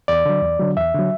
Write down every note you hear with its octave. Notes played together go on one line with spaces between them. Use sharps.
E2 D5
D3 F#3
E2
D3 F#3
E2 E5
D3 F#3